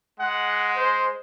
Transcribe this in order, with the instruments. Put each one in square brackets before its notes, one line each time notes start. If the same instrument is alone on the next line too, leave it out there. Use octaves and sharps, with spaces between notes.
[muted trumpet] G#3 [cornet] F#5
[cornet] C5